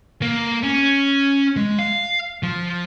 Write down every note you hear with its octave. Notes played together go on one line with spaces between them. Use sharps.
A#3
C#4
G#3
F5
F3